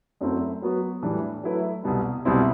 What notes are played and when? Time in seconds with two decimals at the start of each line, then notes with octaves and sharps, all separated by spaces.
0.21 F#2 F#3 A3 C4 E4
0.62 F#3 B3 F#4 B4
1.02 A2 E3 G3 D4
1.43 F#3 A3 E4 B4
1.84 C2 B2 G3
2.25 C2 B2 G3 C4 E4